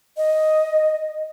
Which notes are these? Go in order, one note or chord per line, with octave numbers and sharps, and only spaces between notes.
D#5